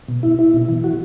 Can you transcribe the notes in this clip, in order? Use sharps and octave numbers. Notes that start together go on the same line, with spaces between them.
B2
E4
E4
B2
E3
F#4